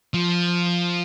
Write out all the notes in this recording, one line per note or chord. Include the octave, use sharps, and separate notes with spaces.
F3